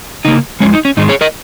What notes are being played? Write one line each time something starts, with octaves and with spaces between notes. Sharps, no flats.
C#3 A#3 D#4
F2 F3 G#3 C#4
D#4
C#4
G#2 D#3 G#3 D#4
G#4 C#5
A#4 D#5